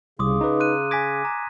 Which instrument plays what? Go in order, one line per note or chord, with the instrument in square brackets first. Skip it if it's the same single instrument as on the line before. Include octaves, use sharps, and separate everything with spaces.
[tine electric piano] C2 [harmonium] C#3 [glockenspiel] C6 D6 D#6
[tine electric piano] D#4 B4 [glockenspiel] A#5
[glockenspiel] C6 F#6 D#7
[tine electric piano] G#5 D6 [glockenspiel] G#6 A#6 B6
[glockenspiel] A#5